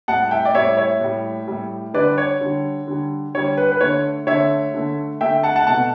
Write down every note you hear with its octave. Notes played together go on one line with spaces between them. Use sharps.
A2 G3 F#5 A5
E5 G5
D5
A2 G3 C#5 E5
C#5 E5
A2 G3
A2 G3
D3 G3 B4 D5
C#5
D3 G3
D3 G3
D3 G3 C#5
B4
B4
D3 A3 C#5
D3 A3 C#5 E5
D3 A3
D3 A3 E5 G5
F#5 A5
F#5 A5
B2 A3 F#5 A5